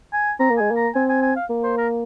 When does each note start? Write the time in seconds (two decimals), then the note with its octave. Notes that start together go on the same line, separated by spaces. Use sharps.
0.13 G#5
0.40 C4 A#5
0.50 A#3
0.58 G#3 G#5
0.71 A#3
0.76 A#5
0.95 C4 G#5
1.09 G#5
1.22 G#5
1.36 F5
1.50 A#3
1.63 C5
1.78 A#4